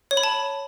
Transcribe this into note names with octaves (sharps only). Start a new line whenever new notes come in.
C#5
B5
A5